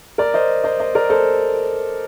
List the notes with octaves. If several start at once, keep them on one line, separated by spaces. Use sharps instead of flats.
A#4 D5
C5 D#5
C5 D#5
C5 D#5
A#4 D5
A4 C5